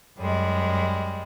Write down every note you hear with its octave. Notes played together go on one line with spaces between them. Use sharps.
F#2 G3 G#3